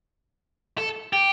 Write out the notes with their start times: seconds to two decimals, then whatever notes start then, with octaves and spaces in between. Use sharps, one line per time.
0.78 A4
1.13 G4